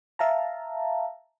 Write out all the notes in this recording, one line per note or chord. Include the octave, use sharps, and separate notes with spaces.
E5 F5 A5 A#5